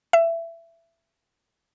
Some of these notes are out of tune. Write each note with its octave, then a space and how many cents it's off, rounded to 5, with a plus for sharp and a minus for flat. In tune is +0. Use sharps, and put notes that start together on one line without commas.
E5 +20